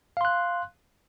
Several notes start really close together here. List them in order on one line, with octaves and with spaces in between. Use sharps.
F5 C6 F#6